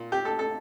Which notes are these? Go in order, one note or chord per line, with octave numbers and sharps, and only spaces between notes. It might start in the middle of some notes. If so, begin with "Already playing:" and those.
Already playing: A#2
G4
A4
A4